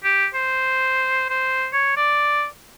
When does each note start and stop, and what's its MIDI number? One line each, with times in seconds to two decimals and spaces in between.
0.04 0.26 67
0.34 1.28 72
1.30 1.67 72
1.73 1.93 73
1.97 2.46 74